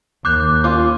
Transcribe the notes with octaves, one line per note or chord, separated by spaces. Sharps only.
D#2 D6 F#6 G6
C#4 F4 D6